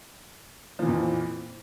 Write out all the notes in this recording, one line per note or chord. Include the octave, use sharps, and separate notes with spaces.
F2 A#2 E3 F3